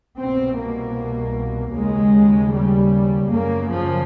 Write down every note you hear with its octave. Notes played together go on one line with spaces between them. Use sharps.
C2 B2 C4
A#3
D#2 C#3 G#3
G3
F#2 C#3 A#3
F3